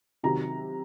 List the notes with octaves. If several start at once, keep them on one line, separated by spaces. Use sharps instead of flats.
C3 D#3 F#3 A#5